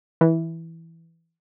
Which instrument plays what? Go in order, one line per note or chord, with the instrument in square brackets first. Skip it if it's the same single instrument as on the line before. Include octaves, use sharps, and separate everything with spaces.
[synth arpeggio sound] E3